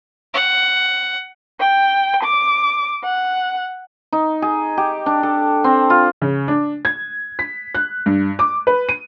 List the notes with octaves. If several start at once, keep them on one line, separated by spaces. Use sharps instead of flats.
F#5
G5
D6
F#5
D#4
G#4
G4
D4
A4
C4
F4
C#3
D4
G#6
B6
F#6
G2
D6
B4
D#7